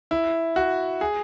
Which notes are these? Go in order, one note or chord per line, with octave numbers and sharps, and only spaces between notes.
E4
F#4
G#4